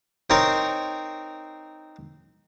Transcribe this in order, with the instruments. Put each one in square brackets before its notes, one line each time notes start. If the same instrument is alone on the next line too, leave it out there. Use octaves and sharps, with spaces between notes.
[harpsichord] C4 D#4 A#4 C5 C#5 C6